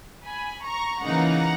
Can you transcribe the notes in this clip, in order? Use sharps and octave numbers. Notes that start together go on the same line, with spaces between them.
G#5 B5
A#5 C#6
C#3 E3 A#3 D#4 F#5 A#5